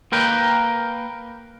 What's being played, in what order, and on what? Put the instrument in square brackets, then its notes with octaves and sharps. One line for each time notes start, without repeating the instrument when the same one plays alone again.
[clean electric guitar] A#3 A#4 B4 G5